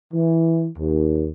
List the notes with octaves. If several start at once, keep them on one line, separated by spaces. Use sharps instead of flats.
E3
D#2